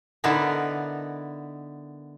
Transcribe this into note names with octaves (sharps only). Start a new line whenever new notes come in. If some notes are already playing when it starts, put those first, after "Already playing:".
D3 B3 D#4 E4 A#4